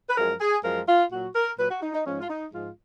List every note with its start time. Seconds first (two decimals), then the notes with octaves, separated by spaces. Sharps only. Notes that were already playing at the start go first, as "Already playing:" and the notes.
0.09 B4
0.17 F#2 F3 G#3 A#4
0.40 G#4
0.64 F#2 F3 G#3 A#4
0.88 F4
1.11 A#2 F#3 F#4
1.35 A#4
1.58 A#2 F#3 B4
1.70 F#4
1.82 D#4
1.94 D#4
2.06 G#2 F3 G#3 C#4
2.21 F4
2.29 D#4
2.53 G#2 F3 G#3 F4